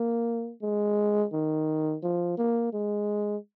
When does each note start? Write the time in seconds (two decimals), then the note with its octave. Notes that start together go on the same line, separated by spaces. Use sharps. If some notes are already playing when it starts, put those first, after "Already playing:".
Already playing: A#3
0.62 G#3
1.33 D#3
2.03 F3
2.38 A#3
2.73 G#3